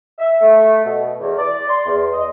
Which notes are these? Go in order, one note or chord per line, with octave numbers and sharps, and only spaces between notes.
E5
A3
B2
E2
D5
C6
E2
D#5